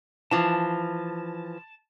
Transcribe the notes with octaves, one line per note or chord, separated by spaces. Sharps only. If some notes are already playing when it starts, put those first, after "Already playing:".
E3 F3 A5